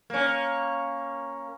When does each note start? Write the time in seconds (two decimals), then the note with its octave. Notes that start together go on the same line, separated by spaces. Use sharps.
0.10 A#3 C#4